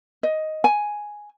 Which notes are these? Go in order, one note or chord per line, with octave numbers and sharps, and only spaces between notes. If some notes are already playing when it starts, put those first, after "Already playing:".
D#5
G#5